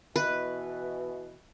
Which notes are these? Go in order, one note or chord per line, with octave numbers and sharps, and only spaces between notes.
B2 E3 B4